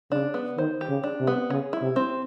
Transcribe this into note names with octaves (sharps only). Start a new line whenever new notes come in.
C#3 D4
B3
D#3 C5
G4
C#3
D4
C3
B3
C#3 G#4
E4
C3
C4